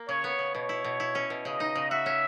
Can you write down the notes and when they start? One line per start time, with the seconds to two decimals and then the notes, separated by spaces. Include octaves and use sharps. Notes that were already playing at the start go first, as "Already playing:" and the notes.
Already playing: A#3
0.09 C#3 C#5
0.24 B3
0.39 C#3
0.55 B2 C#5
0.69 E4
0.85 B2
1.00 E4
1.15 C#4
1.30 B2
1.45 C#3 D#5
1.60 D#4
1.75 C#3
1.91 F#4 E5
2.06 C#4